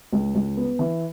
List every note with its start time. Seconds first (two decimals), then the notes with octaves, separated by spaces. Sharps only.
0.13 C#2
0.35 C#2
0.57 B3
0.79 E3